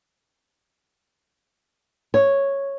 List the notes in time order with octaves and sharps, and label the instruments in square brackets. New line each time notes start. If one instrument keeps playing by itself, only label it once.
[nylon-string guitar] C#5